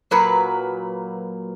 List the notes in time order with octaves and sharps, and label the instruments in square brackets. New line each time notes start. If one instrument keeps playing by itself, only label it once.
[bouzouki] A#2 F#3 A#3 B4